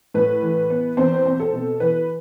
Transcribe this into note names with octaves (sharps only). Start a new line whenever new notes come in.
A2 B4
E3
B3
E2 C4 C5
C4
A4
B2
E3 B4